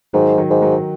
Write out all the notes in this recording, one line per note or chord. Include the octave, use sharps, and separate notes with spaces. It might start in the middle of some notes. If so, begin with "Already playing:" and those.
G#2 D#3 F#3
D#3 F#3
G#2
D#3 F#3